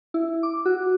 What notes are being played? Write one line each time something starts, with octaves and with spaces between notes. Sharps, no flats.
E4
D6
F#4